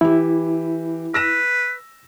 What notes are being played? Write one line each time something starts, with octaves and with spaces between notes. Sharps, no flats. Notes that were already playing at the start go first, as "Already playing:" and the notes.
E3 E4 G4
B4 E6 A#6 E7